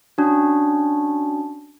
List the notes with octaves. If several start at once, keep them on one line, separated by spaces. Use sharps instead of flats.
C#4 D4 F#4